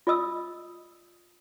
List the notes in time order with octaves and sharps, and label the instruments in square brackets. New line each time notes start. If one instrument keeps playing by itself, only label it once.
[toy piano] F4 D5 D#5 D#6 E6